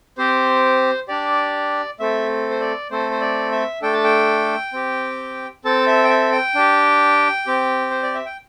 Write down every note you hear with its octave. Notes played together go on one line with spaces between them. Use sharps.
C4 G4 C5
D4 G4 D5
A3 C4 A4 E5
C5
D5
A3 C4 A4 C5
C5
D5
E5
A3 D4 A4 G5
A5
G5
C4 G4
C4 A4 A5
E5
G5
E5
G5
D4 G4
C4 G4
C5
D5
E5
G5